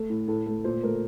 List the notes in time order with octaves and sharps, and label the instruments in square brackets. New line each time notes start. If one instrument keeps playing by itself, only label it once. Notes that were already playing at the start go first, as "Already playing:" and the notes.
Already playing: [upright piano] A3
A2
A2 A4
A3
A#2 C5
A3 A#4